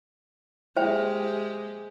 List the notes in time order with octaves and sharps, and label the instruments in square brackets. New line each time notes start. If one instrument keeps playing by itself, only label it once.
[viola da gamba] G#3 G4 [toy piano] C5 E5 G5